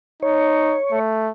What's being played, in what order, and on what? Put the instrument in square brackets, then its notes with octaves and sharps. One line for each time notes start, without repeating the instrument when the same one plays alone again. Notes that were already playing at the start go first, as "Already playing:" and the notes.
[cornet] D#4 [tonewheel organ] C#5
[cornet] A3